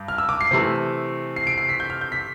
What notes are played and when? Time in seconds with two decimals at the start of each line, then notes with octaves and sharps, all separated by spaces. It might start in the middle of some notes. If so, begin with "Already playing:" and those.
Already playing: G2
0.08 F6
0.18 E6
0.29 D6
0.41 C7
0.51 C3 E3 A3
1.36 C7
1.47 D7
1.58 C7
1.69 B6
1.80 G6
1.90 F6
2.01 G6
2.12 B6